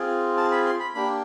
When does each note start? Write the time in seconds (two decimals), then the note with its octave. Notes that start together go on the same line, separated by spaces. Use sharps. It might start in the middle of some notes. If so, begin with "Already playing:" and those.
Already playing: C4 F4 G#4
0.37 A5
0.51 B5
0.66 C6
0.80 B5
0.95 A#3 D4 G4 B5